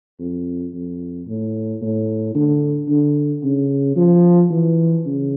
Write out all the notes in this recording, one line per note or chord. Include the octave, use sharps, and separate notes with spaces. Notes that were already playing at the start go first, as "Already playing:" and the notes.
F2
F2
A2
A2
D3
D3
C#3
F3
E3
C#3